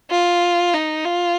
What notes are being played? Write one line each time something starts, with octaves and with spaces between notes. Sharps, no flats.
F4
D#4
F4